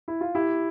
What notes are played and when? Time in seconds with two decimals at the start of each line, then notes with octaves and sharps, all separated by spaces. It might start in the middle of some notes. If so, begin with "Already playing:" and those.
0.08 E4
0.21 F4
0.35 E4 G4